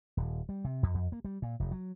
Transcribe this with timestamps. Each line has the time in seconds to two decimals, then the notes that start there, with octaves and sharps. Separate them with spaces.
0.17 D#1
0.49 G3
0.65 C3
0.83 F2
0.94 F2
1.12 A#3
1.24 G3
1.42 A#2
1.60 F1
1.71 F#3